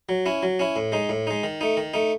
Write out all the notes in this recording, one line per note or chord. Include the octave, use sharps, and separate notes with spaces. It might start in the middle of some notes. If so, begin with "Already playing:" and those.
F#3
C#4 E4
F#3
C#4 E4
A2
G#3 D#4
A2
G#3 D#4
D#3
A3 D#4
D#3
A3 D#4